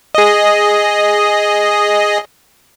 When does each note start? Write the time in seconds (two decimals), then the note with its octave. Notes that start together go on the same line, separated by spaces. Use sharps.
0.15 G#4 D#5